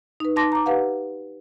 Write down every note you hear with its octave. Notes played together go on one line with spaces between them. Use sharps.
D#4 B4
D#4 A5 C6 D6 A#6
A#5 D6
G4 B4 F5 F#5